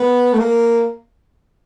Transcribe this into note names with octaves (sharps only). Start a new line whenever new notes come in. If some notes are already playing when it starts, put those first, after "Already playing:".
Already playing: B3
A3
A#3